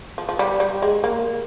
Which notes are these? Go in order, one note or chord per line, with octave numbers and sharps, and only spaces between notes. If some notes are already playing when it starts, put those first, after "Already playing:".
F3
F3
G3
G3
G#3
A#3